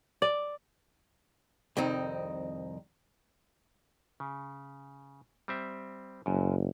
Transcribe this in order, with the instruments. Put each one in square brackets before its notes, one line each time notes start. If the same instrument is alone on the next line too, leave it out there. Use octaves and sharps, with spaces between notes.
[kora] D5
[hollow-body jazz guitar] C2 F2 D#3 C4 D#4
[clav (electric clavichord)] C#3
G3 C4 E5
[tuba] F#1 [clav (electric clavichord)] F#2